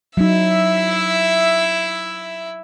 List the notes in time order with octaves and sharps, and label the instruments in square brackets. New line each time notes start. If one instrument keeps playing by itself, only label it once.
[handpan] F#3 D#4 [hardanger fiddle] E4 E5